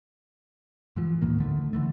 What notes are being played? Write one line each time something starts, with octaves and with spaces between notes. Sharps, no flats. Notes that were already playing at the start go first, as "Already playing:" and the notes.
G#2 E3 F3
D2 A2 D#3 A#3
A2 D3 D#3 A3
D3 E3 A3